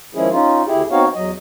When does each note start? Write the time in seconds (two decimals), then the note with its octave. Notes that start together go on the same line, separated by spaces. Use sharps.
0.15 D#3 F3 G#3 C#4 E4 G#4
0.32 C#4 D#4 F4
0.67 D2 E4 G4 G#4
0.91 B3 C4 D#4 F#4 C#5 F5
1.15 E2 F#3 D#5